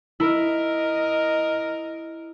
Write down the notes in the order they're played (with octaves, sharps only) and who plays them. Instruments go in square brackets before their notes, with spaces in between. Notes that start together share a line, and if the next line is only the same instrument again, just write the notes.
[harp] E4 [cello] A#4 D#5